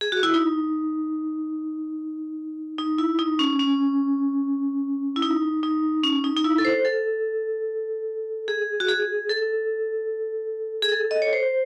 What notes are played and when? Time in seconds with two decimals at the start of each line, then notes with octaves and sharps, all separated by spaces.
0.01 G#4
0.12 F#4
0.23 E4
0.34 D#4
2.78 D#4
2.98 E4
3.19 D#4
3.39 C#4
3.59 C#4
5.16 E4
5.22 D#4
5.63 D#4
6.03 C#4
6.24 D#4
6.37 D#4
6.44 E4
6.58 A4
6.65 C5
6.85 A4
8.48 G#4
8.80 F#4
8.88 G#4
9.29 A4
10.82 G#4
10.92 A4
11.11 D#5
11.22 C#5
11.33 C5